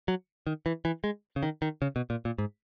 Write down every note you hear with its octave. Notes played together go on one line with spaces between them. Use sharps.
F#3
D#3
E3
E3
G#3
C#3
D#3
D#3
C#3
B2
A#2
A#2
G#2